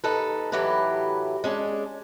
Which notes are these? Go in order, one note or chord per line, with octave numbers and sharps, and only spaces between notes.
D#2 D#4 A4 B4
A2 E3 F#3 A3 G4 B4
G#3 C#4 D4